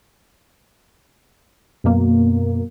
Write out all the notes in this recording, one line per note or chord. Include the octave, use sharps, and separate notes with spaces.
F#2 B2 A#3